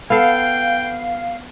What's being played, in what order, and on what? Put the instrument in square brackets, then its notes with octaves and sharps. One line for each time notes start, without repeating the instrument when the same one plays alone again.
[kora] B3 A4 [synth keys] F5 C7 [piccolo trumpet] G5